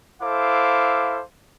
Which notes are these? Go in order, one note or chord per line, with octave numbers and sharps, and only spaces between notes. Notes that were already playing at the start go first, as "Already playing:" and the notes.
E4 A4 C5 F5 D6